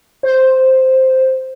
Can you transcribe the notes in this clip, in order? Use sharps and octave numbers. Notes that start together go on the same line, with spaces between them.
C5